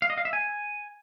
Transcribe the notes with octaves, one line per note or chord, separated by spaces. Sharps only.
F5
D#5
F5
E5
G#5